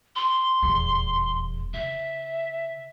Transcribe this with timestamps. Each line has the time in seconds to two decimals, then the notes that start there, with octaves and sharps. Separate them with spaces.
0.16 C6
0.63 D#1 E2
1.73 C#3 E5